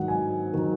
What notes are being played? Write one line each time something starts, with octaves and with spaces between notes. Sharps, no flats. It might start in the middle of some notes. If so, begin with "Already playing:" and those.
Already playing: G#2 D#3 F#3 F#5
G#5
D#3 F#3